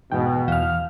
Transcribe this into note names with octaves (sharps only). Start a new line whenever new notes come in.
E2 G#2 B2 G5
E2 E3 F5 F6